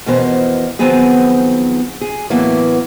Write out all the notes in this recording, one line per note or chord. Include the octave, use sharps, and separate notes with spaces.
F2 B2 E3 B3 A#4 C5
D#3 F3 F#3 B3 C4 G#4
G#4
A2 E3 F#3 A#3 B3 E4